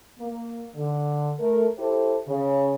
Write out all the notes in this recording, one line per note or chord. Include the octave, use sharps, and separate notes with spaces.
A#3
D3
A3 A#4
E4 G4 A4 C5
C#3